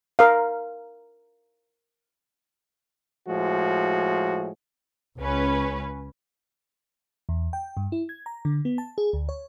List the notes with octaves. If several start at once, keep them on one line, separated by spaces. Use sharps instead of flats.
A#4 F5
A2 F3 G#3 F#4
C#2 C#4 B4
E2
G5
G2
E4
G#6
A#5
D3
B3
A5
G#4
D2
C#5